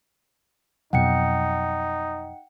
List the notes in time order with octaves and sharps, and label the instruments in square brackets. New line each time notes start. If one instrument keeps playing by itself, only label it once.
[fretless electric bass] F2 B2 F#3 [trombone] D#4 [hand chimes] F#5 G5 C#7